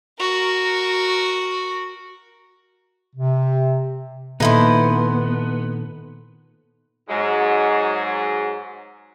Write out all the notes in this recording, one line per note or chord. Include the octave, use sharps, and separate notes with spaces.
F#4 A#4
C3
A#2 D#3 B3 D#4 E4 A4 C5
G#2 F#3 G#3